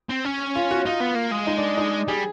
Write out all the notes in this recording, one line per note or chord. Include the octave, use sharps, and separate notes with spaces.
C4
C#4
F4
F#4
D#4 F4
B3
A#3
G#3
D#4
D4
D#4
G3 G#4